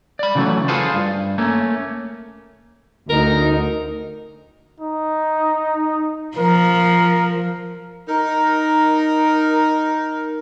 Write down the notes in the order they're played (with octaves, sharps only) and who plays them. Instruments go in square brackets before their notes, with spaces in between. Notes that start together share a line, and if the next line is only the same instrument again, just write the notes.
[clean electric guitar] D5 B5
C#3 E3 F#3 A3
F4 G#4 A4 B4 C5
G2
A3 A#3 C#4
[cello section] D2 D#4 [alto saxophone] A#4
[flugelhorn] D#4
[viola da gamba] F3 [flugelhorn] A#4
[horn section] D#4 A#4